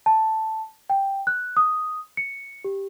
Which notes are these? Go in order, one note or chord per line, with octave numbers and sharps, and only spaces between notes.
A5
G5
F#6
D#6
C#7
G4